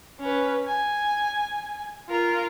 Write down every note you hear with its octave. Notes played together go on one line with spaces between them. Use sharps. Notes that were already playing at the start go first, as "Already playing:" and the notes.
C#4 B4
G#5
F4 A#4